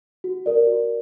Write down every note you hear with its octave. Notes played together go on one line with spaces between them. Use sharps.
F#4
A#4 D5
F#4